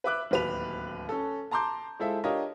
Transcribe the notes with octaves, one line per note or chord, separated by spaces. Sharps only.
B4 E5 D6 F#6
D1 D#2 B4 B5 F7
C#4 A4
A5 A#5 C6 D6 G6
G#3 E4 F4 A4 C5 E5
D4 F4 G4 A#4 C#5 D#5